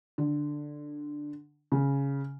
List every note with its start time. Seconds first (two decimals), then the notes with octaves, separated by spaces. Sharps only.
0.18 D3
1.72 C#3